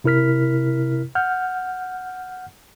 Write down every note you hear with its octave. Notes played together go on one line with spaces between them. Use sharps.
C3 E4 A#4 F6 B6
F#5 F6 G6